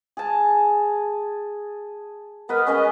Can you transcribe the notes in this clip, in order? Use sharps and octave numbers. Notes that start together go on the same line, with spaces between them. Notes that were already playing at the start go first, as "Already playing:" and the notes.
G#4 A5
B3 A#4 B4 D#5
G#3 B3 C#4 D#5